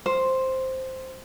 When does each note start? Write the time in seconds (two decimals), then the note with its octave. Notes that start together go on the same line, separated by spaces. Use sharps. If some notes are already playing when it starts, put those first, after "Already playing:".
0.06 C5